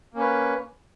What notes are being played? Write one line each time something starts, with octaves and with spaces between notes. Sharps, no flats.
A#3 C#4 B4